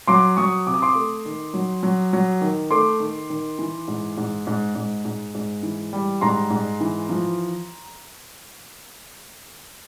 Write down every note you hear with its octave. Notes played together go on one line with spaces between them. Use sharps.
F#3 C6 D6
F#3 C#6 D#6
C3 D6
D#6
C6 D6
A3
D#3
F#3
F#3
F#3
D#3
A3 C6 D6
D#3
D#3
E3
G#2
G#2
G#2
G#2
G#2
G#2
E3
G3
G#2 A#5 C6
G#2
E3
F3